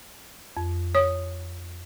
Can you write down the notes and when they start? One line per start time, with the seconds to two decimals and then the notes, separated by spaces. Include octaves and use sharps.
0.57 F2
0.95 C#5 D#6